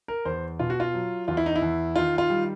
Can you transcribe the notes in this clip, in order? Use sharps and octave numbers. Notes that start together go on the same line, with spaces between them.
A#4
E2 C5
B2 F4
F#4
F4
F#3
E2 F4
E4
D#4
E4
E2
D#3 F4
F4
G3